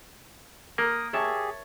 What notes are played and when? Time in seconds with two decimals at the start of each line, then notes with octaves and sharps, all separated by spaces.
0.78 A#3 A#4 D#6
1.13 G4 G#4 C#5 E5 A5